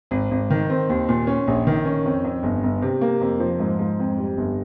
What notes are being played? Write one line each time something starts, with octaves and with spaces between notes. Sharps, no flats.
G#1
G#1
D#3
C4
D#2
A#2
C#4
A#1
D#3
C#4
F2
F2
G1
G1
C3
A#3
F2
F3
G#2
G#2
F2
G3
G1